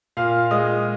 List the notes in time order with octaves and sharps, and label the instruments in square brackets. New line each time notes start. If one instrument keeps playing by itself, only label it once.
[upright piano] A#2 F5 F6
G#3 D#5 D#6